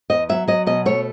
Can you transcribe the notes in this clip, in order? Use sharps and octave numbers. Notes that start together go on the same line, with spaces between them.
E2 D#5
F#3 E5
F#3 D#5
B2 D#5
A3 C#5